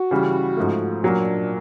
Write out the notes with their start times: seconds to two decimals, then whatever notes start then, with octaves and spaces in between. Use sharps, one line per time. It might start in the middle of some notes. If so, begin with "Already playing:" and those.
Already playing: F#4
0.11 C#3 E3 G3
0.57 G#2 F3 A3
1.03 A#2 F#3 A#3 D4